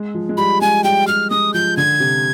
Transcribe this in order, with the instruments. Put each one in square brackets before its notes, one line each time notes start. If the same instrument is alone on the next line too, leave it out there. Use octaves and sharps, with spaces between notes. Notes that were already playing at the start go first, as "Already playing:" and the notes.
Already playing: [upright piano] G#3
F3
G#3
[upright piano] G3 [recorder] B5
[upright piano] G#3 [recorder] G#5
[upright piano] G3 [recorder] G5
[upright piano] G3 [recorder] F6
[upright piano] G#3 [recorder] D#6
[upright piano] F3 [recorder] G6
[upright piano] D3 [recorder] G#6
[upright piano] C3